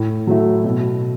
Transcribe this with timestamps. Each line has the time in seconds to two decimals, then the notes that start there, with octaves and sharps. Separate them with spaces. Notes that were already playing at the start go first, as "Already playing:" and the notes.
Already playing: A2
0.27 F#3 A3 E4
0.64 B2